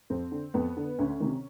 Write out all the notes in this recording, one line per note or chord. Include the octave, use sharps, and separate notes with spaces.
F2 C4
D3
F2 B3
D3
D2 C#4
C3 D#3